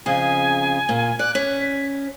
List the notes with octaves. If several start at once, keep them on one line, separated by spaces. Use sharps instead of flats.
F2 C#3 G#4 G#5
A#2
D5 F#6
C#4 B6